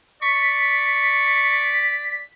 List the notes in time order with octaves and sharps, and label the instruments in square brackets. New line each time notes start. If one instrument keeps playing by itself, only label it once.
[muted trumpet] D5 [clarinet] C#6 [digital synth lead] B6